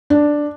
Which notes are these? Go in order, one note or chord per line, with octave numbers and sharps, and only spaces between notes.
D4